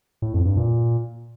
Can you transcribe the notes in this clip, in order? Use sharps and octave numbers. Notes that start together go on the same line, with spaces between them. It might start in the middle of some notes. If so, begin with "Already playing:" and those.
A2
F2
G2
A#2